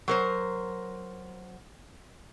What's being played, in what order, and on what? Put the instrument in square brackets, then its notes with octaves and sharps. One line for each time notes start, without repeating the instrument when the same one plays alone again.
[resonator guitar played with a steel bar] F#3 A#4 C5